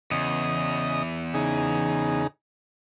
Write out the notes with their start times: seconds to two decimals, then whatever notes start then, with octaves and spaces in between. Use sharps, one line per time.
0.11 E2 C#3 D#5 D#6
1.34 C#3 D#4 G#4